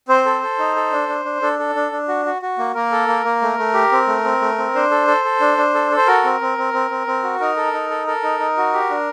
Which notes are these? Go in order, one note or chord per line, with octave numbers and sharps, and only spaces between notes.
C4 C5
A4
A4
D#4
A4
D4
D4
D4
D4 A4
A4
D4
D4
F#4
F#4
F#4
A#3
A#3 A#4
A4
A#3
A#3
A3
A3
G4
C4
A3
C4
A3
C4
D4 C5
A4
A4
A4
D4
D4
A4
A4
C5
F#4 A#4
C4
C4
C4
C4
C4
C4
F#4
D#4 A#4
A4
D#4
A4
A4 A#4
D#4
D#4
F#4
G4
D4